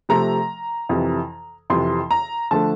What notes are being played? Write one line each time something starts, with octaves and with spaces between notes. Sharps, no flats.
C3 F3 A3 A#5
F2 C3 E3
F2 C3 E3 C6
A#5
D3 F3 A3 A5